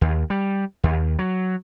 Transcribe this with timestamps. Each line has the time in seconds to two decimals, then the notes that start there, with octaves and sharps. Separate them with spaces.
0.01 D#2
0.30 G3
0.84 D#2
1.19 F#3